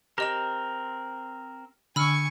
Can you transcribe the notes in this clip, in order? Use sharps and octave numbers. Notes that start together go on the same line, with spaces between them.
C4 G4 A#4 D#5 E7
D3 G#5 B5 C#6 E6 F6